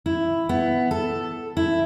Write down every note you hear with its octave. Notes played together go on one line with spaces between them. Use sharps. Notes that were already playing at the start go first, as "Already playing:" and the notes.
E4
B3
A4
E4